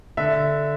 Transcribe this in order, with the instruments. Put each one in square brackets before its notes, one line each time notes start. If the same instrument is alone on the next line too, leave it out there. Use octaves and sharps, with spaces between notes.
[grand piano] D3 E5